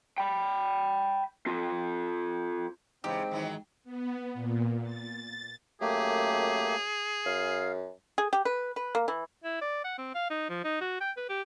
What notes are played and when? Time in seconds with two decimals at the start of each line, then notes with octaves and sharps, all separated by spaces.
0.18 G5 B5
1.46 C4 F4
3.04 E2 C#3 G#3 C4 D#4 G4
3.31 D#3 E3 F#3
3.84 B3
4.34 A#2
4.83 A6
5.81 F#2 A3 A#3 G4 G#4
7.26 F#2 F5
8.18 G#4
8.33 G4
8.45 B4
8.76 B4
8.95 A#3
9.08 E3
9.44 E4
9.61 D5
9.84 F#5
9.98 C4
10.15 F5
10.30 D#4
10.49 F3
10.64 D#4
10.81 F#4
11.00 G5
11.17 B4
11.29 G4